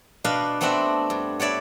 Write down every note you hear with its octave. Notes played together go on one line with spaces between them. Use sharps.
B2 D4 B4 D#5 F5
A3 B3 C4 D4 F#4 E5
G2
B3 C#5 D5 E5